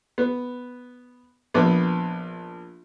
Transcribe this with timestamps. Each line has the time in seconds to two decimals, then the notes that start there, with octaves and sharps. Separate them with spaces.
0.18 B3
1.54 A#1 B3